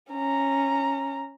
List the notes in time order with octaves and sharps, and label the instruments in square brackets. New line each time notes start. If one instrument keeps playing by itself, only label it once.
[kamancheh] C#4 A#5